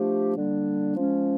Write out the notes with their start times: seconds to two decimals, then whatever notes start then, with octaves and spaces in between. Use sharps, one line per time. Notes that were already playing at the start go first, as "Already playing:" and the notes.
Already playing: F3 A3 D4 G4
0.36 D3 G3 A#3 D4
0.96 F3 G#3 C#4